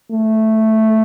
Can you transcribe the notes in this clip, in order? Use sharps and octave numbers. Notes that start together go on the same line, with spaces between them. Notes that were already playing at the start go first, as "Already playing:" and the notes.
A3